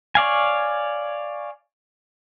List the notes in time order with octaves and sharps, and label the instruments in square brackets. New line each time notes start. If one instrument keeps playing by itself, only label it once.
[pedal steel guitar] C#5 D5 F5 G#5